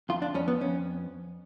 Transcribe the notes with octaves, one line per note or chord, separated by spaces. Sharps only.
F2 F4
D4
F2 C#4
B3
F2 C#4